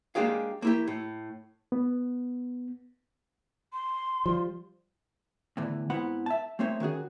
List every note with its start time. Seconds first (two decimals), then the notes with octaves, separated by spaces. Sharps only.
0.15 G#3 A#3 D4 G4 G#4 F5
0.62 A#3 E4 G4
0.88 A2
1.72 B3
3.73 C6
4.26 F3 G3
5.57 E2 A2 D3 E3
5.90 G#2 B3 C4 E4 F#5 B5
6.26 E5 A5
6.59 A3 A#3 C4 D#4 C#5 E5
6.80 D#3 C#4 F#4 G#4